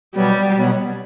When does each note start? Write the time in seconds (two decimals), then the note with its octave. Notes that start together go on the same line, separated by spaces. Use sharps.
0.16 B2 F#3 G3 B3
0.57 B2 F#3 B3